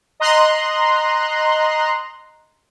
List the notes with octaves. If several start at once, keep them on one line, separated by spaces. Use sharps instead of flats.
D#5 A#5 C6 F#6